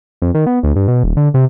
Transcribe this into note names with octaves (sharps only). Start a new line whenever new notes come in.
F2
D#3
B3
D2
G2
B2
D#1
D3
C3